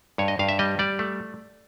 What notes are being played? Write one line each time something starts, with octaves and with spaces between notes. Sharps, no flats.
G2 C#5
D#5
G2 F5
E5
G3 D#5
G3 D5
A3